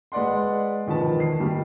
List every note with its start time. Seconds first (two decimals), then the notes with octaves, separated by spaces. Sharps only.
0.12 G#3 B4 D5 F#5 C6
0.87 E1 D#3 F3 B4 A5
1.20 C7
1.40 D#3 G3